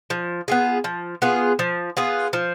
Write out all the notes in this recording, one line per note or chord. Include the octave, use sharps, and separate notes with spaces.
F3
B3 F4 G#4
F3
B3 F4 G#4
F3
B3 F4 G#4
F3